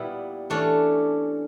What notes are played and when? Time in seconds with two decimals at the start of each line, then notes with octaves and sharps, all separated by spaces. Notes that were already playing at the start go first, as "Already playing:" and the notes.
Already playing: A#2 G3 B3 E4
0.50 E3 A3 C#4 D4